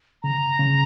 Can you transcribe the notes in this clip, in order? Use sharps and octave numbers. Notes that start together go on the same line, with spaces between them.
C#3 A#5
C#3